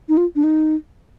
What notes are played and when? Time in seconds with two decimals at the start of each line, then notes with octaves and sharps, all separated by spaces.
0.09 D#4
0.17 F4
0.36 D4
0.44 D#4